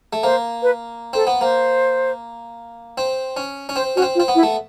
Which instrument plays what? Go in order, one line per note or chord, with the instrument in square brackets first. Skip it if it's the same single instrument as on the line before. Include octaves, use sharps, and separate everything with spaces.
[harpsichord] A3
[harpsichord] A#3 [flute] C5
[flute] B4
[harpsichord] C4 [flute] A4
[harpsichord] B3
[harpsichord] A#3 [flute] C5
[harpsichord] C4
C#4
C#4
[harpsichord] C4 [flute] C5
[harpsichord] C#4 [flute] F#4
[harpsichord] C4
[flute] F4
[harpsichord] C4
B3
[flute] E4
[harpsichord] A3